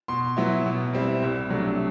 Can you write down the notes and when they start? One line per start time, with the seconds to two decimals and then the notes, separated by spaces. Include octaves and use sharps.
0.08 B2 C6
0.37 F#3 B3 E4
0.66 B2
0.93 G3 C4 E4
1.22 C2
1.50 C3 F#3 A3 D4